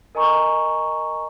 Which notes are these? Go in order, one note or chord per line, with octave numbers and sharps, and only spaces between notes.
A#4 D#5 G#5 A#5 C#6